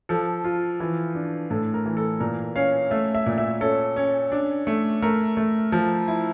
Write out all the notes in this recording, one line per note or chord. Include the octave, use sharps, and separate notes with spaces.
F3 A4
F4
E3
D4
A2 A4
A#4
E3
A4
A#2 A#4
C#4 F5
A3 E5
E5
A#2
E5
C#4 A4
C#4
D4
A3
A3 A#4
A3
F3
E4